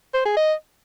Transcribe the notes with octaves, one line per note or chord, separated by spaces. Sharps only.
C5
G#4
D#5